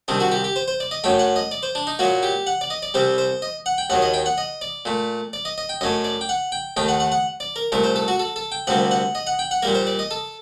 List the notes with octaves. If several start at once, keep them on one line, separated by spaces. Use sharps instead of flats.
C2 C3 D#3 D4
F#4
G4
G4
C5
C5
D5
D#5
F#2 F#3 A3 G5
F#5
D#5
D5
C5
D4
D#4
A#2 F#3 A#3 F#4
G4
F#5
D5
D#5
D5
C2 C3 G3 C5
C5
D#5
F#5
G5
D#2 D#3 F#3 F#5
D#5
G5
F#5
D#5
D5
A#2 A3
D5
D#5
D#5
G5
F#2 F#3 A3 D#5
D5
G5
F#5
G5
D#2 D#3 A3 G5
F#5
F#5
F#5
D5
A#4
C2 A#2 A3 A#4
C5
A4
F#4
A4
A4
G5
D2 C3 G3 A#3 F#5
F#5
D#5
F#5
G5
F#5
A#2 G3 A#3 A#4
C5
D5
D#5
A4